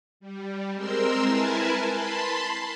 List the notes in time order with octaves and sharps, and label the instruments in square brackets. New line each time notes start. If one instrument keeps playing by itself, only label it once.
[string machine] G3
G#3 C4 A#4 C6 E6
E4 A#4 B4 G#5 A5
A5 B5 C6